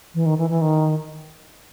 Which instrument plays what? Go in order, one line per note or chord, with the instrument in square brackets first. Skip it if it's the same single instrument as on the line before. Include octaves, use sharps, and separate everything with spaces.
[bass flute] E3
D#3
E3
E3
D#3